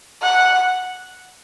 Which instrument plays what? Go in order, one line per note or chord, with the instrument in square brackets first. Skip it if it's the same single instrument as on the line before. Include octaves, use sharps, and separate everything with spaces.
[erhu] F#5